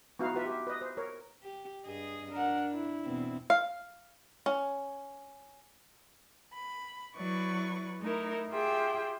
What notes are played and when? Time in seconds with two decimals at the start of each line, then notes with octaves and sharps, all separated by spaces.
0.19 B3 D#4 E4 F#4 F5
0.33 F4 F#4 B4 E5
0.46 G4 E5
0.67 B4 D#5
0.81 C5
0.97 A#4 C#5
1.43 G4
1.86 G2 G#4 D#5
2.32 D4 A#4 F#5
2.72 E4
3.05 E2 B2 C4
3.50 F5
4.46 C#4
6.54 B5
7.17 F#3 E4 B4 D5 C#6
8.00 A3 D#4 E4 A#4
8.50 F4 G4 G#4 E5 G5